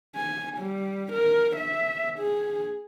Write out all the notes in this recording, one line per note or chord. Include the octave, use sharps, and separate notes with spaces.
G#5
G3
A#4
E5
G#4